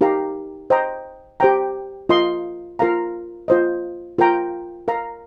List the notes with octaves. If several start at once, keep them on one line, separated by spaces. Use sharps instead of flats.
D#4 G4 A#4 F5 A#5
C5 D#5 G5 A#5
G4 C5 G5 A#5
F4 A#4 D#5 C6
F4 A#4 F5 A#5
F4 C5 D#5
F4 A#4 G5 A#5
A#4 F5 A#5